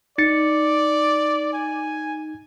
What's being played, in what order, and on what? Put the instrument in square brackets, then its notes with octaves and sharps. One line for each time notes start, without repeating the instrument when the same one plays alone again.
[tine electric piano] D#4 A6 C#7 [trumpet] D5
[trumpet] G#5